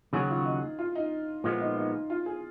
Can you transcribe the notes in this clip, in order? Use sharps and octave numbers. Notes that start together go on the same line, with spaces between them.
D#2 C#3 F#3 C#4 F#4 G#4
F4
D#4
F4
D#4
A#2 F3 G#3 B3 F4
D#4
D#4
F4
G#4